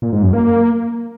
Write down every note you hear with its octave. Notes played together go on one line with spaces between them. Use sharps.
A#2
G#2
F#2
A#3